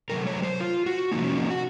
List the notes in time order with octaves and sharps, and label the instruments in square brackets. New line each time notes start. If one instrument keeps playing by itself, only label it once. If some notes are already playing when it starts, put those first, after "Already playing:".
[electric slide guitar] C3 F#3 A3 A#4
C#5
C5
F4
F#4
C3 F3 A#3 D#4
C#4
D#4
F#4